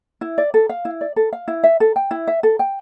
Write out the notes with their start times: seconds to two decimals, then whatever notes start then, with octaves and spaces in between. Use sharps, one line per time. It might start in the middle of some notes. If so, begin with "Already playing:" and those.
0.21 E4
0.38 D5
0.54 A4
0.69 F5
0.85 E4
1.01 D5
1.16 A4
1.33 F5
1.48 E4
1.63 E5
1.80 A4
1.96 G5
2.11 E4
2.27 E5
2.43 A4
2.59 G5